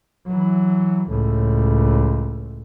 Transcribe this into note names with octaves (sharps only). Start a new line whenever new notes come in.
E3 F#3
C#2 A2